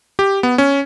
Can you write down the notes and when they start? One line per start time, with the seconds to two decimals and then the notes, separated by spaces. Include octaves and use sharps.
0.19 G4
0.43 B3
0.58 C#4